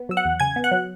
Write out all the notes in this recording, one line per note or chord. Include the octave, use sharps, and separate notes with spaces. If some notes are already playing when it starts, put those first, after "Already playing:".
Already playing: B3
F#3 E6
F#5 F#6
E2
C#3 G#5 G#6
B3
F#5 F#6
F#3